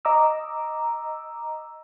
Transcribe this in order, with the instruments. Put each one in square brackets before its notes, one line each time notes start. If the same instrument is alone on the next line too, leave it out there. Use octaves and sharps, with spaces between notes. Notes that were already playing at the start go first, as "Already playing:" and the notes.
[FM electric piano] D#5 A#5 D6 E6